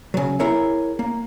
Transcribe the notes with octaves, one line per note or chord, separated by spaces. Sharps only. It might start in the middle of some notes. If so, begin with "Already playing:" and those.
C#3 F#3
E4 G#4 A#4 C#5 E5
A#3